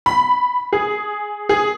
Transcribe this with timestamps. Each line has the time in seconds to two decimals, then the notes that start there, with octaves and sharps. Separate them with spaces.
0.06 B5
0.73 G#4
1.49 G#4